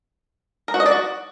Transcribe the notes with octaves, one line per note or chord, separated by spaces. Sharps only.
A#4
F#4
D#5
D5
F#4